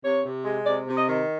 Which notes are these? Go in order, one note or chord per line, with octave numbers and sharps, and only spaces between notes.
C3 C#5
C3
G#3
C3 D5
C3
D#5
D#3